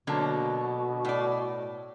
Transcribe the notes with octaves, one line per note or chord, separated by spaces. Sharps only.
B2 D3 F#3 A#3 C#5 A5 A#5
A2 D5